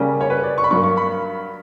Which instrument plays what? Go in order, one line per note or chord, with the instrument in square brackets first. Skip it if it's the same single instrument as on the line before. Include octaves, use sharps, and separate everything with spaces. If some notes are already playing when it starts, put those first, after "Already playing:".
Already playing: [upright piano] C#3 G3 A#3 C#4
C#5
B4
D5
C#6
B5
G2 F#3 A#3 C#6
C#6
B5